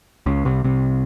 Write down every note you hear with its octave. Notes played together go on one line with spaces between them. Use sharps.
C#2 C#3
C2 C3
C2 C3